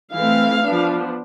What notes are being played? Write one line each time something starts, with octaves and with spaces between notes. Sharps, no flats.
E3 A3 C4 F5
F3 B3 D4